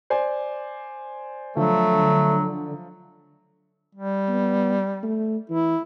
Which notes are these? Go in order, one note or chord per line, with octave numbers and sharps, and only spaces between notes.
C5 D5 G#5
D3 F3 F#3 A3
G3
B3
A3
E3 E4